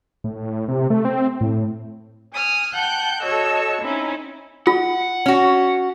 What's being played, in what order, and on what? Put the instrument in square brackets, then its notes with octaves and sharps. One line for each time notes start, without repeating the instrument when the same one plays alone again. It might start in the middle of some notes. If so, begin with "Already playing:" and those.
[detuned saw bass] A2
C3
A3
C4
A2
[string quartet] G#5 D#6 F6
F#5 G5 A5 F#6 G6
F#4 A4 C#5 D#5 E6
C4 C#4 D#4 E4
[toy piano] F4 [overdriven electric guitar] F#5
[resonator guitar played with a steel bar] C#4 F#4